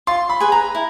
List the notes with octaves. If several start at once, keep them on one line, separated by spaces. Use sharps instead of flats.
F4 C6
B5
G#4 B4
A#5
E4